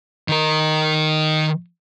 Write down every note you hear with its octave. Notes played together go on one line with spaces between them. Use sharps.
D#3 A#4